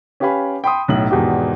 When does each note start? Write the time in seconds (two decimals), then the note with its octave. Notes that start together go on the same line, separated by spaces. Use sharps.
0.20 C#4 G4 B4 F5 G#5 B5
0.64 G5 B5 C6 D#6
0.88 B1 A2 F#7
1.11 G#1 E2 B2 G4